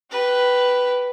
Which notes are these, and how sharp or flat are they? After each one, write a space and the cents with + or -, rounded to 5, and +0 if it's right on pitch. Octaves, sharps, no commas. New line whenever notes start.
G4 -20 B4 +0